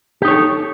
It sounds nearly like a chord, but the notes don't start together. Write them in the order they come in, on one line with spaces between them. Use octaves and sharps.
G4 D#4 C#5 A4